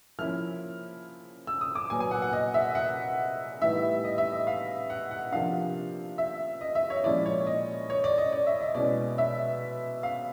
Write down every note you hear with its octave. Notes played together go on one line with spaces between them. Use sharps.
F3 A#3 C#4 E4 F6
E6
D#6
D6
A#2 F#3 B3 G#5
G#5
F#5
F#5
D#5
E5
F#5
A2 E3 G3 B3 D#4 E5
D#5
E5
D#5
F5
F#5
F#5
C3 F3 A#3 D4 F5
E5
D#5
E5
C#5
A#2 F3 G#3 C#4 E4 D5
C#5
D#5
C#5
D5
D#5
D5
E5
D#5
B2 G#3 C#4 E4 D5
E5
F5